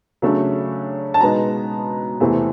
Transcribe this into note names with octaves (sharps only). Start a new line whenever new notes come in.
C#3 F#3 A3 D4
A5
B2 G#3 B3 D#4 A#5
E2 C3 E3 A3 C4